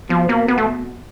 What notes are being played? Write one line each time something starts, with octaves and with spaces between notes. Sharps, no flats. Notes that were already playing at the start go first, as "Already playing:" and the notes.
B2 F3
B2 A#3
B2 B3
A3